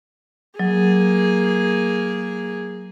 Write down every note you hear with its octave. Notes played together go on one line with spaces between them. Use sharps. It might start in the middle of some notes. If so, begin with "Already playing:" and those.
F#3 A#3 G#4